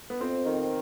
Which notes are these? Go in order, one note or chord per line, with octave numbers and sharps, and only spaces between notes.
B3
F2 C4
D#3